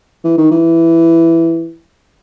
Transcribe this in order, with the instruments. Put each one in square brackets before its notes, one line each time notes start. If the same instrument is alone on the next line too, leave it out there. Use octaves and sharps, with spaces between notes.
[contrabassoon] E3
D#3
E3